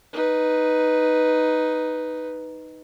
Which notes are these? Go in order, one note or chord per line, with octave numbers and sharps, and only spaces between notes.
D#4 B4